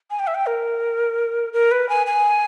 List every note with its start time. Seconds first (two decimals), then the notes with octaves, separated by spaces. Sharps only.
0.11 G#5
0.19 G5
0.27 E5
0.35 G5
0.46 A#4
1.53 A#4
1.71 B4
1.89 G#5
2.07 G#5